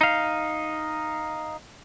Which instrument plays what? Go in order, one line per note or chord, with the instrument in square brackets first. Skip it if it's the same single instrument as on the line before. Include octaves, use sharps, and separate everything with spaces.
[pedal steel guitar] D#4 F5